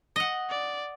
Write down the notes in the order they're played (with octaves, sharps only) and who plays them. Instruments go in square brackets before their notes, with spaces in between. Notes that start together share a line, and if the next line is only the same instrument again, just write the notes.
[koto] D#5 F#5
[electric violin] D5